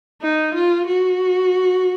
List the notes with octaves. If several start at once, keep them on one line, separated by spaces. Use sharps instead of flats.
D#4
F4
F#4